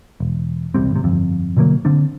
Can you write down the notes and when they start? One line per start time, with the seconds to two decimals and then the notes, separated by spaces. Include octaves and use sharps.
0.20 E1
0.74 E1 C2 G3 C4
0.91 G#1 C3
1.03 G1 F2
1.57 B2 D3 F#3 A#3
1.85 D3 C4 D4